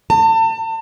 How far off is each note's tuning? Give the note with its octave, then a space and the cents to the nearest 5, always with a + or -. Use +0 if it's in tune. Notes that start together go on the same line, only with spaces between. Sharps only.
A5 +35